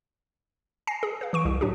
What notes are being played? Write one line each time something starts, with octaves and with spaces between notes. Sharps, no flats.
G#5 A#6 C7
G#4
B4 F5
E3 C#6 D7
C2 G4
A2 F#3 D4 F#4 G4